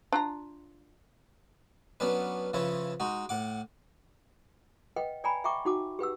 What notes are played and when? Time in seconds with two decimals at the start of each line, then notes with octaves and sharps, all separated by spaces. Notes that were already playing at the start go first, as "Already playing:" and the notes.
0.12 D4 F4 A#5
2.00 F#3 B3 C#4 D4 B4
2.53 C#3 F3 E4 B4 C#5
3.00 G#3 D#4 F#4
3.29 A2 F#5 D6
4.96 B4 D#5 F#5 G5
5.24 D5 G5 G#5 A#5 B5
5.44 E5 F#5 G5 A#5 C#6 D6
5.65 D#4 F#4 F#5 A5 D6
5.99 G4 B4 F#5 E6